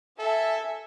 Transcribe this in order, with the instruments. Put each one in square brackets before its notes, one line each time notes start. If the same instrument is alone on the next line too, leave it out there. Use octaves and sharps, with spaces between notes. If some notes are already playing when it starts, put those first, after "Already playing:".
[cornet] A4 [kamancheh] E5 G#5